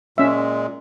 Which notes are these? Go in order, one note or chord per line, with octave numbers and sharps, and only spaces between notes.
A#2 G#3 C#4 E5